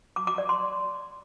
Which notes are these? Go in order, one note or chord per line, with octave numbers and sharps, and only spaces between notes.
D6
D6
D5
C6